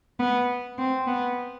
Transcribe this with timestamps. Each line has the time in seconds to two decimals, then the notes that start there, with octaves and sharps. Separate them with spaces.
0.20 B3
0.78 C4
1.07 B3